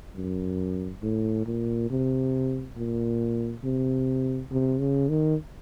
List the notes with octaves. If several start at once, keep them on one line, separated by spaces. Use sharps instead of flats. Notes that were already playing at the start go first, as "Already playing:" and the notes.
F#2
A2
A#2
C3
A#2
C3
C3
C#3
D#3